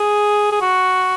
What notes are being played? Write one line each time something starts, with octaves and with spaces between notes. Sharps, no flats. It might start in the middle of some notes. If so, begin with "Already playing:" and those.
Already playing: G#4
G#4
F#4